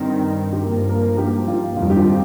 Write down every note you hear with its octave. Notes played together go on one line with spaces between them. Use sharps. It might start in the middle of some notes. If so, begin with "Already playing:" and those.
Already playing: G2 D#3 C4
G4
G2 F3 A#3 A#4
A#4
G4
F4
F2 D#3 G3 C4 F4
G4
F4